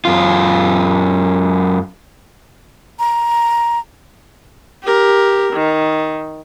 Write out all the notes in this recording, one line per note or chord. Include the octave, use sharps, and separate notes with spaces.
F#2 F4
A#5
G4 A#4
D#3